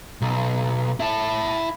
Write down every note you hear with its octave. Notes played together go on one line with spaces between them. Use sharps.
B1
E4 A5